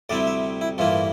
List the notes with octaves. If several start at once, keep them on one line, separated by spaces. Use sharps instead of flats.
D2 C3 G3 C4 E4 D5
E5
E4
A1 G2 E3 A#3 E4 F4